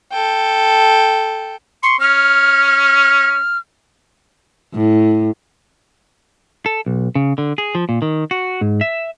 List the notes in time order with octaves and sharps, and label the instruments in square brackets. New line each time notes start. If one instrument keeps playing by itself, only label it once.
[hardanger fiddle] A4 G5
[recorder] C6 [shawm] C#6
[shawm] C#4 [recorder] F6
[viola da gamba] A2
[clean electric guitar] A4
B1
C#3
D3
G#4
F3
A#2
D#3
F#4
G#2
E5